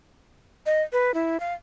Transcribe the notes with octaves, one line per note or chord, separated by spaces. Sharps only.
D#5
B4
E4
F5